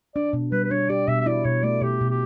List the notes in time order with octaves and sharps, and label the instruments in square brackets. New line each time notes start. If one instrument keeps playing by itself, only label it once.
[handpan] D4 [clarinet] D5
[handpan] B2
[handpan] G3 [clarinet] B4
[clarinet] B4
[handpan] D4 [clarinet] C#5
[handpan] G4 [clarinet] D5
[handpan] B2 [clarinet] E5
[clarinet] E5
[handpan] E4 [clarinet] D5
[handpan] B2 [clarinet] C#5
[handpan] A3 [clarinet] D5
[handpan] B2 [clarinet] G4
[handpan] B2
[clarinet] G4